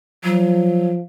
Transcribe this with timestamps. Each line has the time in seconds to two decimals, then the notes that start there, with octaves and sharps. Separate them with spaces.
0.24 F3 F#3